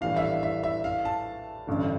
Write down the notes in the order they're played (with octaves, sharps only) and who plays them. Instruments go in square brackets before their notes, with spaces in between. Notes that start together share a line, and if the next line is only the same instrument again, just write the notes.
[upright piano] A#1 A2 E3 G3 D4 [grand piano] F5
[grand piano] E5
F5
E5
E5
F5
A5
[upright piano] A1 G2 D3